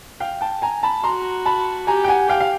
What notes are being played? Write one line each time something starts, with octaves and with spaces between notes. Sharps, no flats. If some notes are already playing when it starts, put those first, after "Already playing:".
F5 G5
G5 A5
G#5 A#5
A5 B5
F#4 A#5 C6
A5 B5
G4 G#5 A#5
G5
F#5 G#5
F5 G5
F5